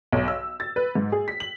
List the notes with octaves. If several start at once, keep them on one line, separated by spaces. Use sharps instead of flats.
B1
E6
A6
B4
G#2
G#4
B6
F#7